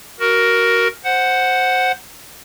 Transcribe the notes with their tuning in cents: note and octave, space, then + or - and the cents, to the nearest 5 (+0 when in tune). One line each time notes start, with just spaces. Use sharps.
F#4 +15 A#4 +5
C5 +0 F#5 +0